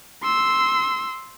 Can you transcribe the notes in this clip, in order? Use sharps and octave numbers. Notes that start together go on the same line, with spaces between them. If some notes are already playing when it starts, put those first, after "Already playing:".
C6 E6